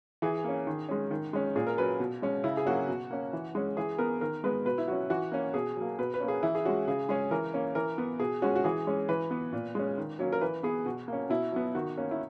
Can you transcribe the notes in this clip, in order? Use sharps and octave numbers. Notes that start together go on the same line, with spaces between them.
E3 G#4
A#3 C#4
D#3
G#3 C#4
D#3
G#3 C#4
A#2 G#4
A#4
F#3 C#4 B4
B2
G#3 C#4
C#3 E4
G#4
F#3 A#3 C#4 F#4
B2
A#3 C#4
E3
G#3 C#4
E3 G#4
B3 A#4
D#3 A#4
G#3 B3 B4
B2 B4
E4
F#3 C#4 F#4
E3 F#4
A#3 C#4
B2 G#4
F#3 A#3
B2 B4
B4
A#3 C#4
G#4
E3 E4
G#4
G#3 C#4 F#4
C#3 G#4
G#3 C#4 G#4
E3 A#4
A#3 C#4
E3 A#4
B3
B2 G#4
G#3 C#4 F#4
F#4
E3 G#4
G#3 C#4
E3 B4
B3
A#2
G#3 C#4
D#3
F#3 A#3 C#4
A#4
E3 B4
B3 G#4
B2 F#4
A#3 C#4
B2 E4
F#3 B3
D#3 F#4
A#3 C#4
E4